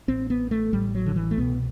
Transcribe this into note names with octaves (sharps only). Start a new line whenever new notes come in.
A1 A2 C4
B3
A3
A1 A2 G3
F#3
D3
E3
A3
C2 B2 B3